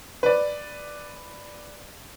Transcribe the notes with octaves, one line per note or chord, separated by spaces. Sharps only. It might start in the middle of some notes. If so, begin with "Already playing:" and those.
B4 D5